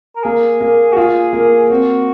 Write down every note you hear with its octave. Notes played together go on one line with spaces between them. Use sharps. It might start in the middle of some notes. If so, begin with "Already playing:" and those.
A#4
A#3 G#4
A#3
F#4
F4 G#4
A#3
C4 F#4